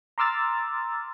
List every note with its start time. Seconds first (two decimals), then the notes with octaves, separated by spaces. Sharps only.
0.18 A#5 C6 D6 E6 F6 A6